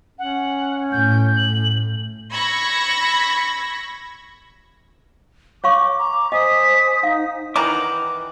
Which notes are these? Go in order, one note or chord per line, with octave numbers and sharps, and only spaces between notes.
C#4 F#5
A2 G6
F#7
B5 C#6 E6 G#6 A#6
C#5 F5 C#6 D6
A#5
D6
C5 D#5 G#5 D#6 B6
D#4 F5
D#3 E3 F#5 A#5 D6